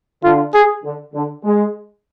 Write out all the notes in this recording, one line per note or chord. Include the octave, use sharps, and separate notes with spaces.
D3 F4
G#4
D3
D3
G#3